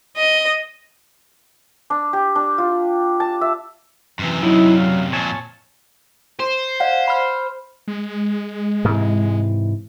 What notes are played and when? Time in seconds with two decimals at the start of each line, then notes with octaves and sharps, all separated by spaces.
0.17 D#5
1.90 D4
2.13 G4
2.35 D4
2.58 F4
3.20 A5
3.41 E5
4.19 F#2 C3 E3
4.43 F#3 D#4 E4
4.77 F5
5.13 F2 A#2 C#5 G#5 A5
6.40 C5
6.80 D5 F5 F#5
7.08 B5 F6
7.88 G#3
8.85 G#2 C3 E3